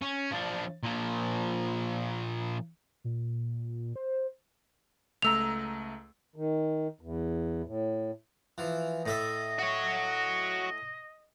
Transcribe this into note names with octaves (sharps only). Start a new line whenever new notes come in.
C#4
F3 D4
A#2 F3
A#2
C5
C#2 A3 A#5 E6 F7
D#3
E2
A2
E3 F3
A2 A4 D#5 E5
F#4 C#5